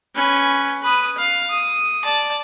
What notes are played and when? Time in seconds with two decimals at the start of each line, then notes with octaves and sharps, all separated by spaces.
0.16 C#4 B4
0.82 B4 D#6
1.18 F5
1.50 D#6
2.03 D5 A5